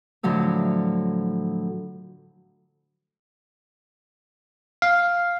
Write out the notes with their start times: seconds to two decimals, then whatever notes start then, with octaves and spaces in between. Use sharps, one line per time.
0.23 A2 D3 F3 F#3 A3
4.82 F5